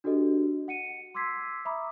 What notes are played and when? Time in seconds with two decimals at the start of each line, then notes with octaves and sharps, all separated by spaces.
0.04 D4 F#4 G4 A4 D#5
0.68 F#5 C#7 D#7
1.15 C6 D6 E6 G#6 B6 C7
1.65 E5 A#5 B5 D6 D#6